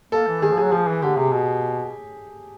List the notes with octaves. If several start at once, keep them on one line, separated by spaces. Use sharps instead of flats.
A#3 A4
E3
D#3 G#4
F3
F#3 G#4
F3 G#4
E3
D3 G4
C3 G#4
B2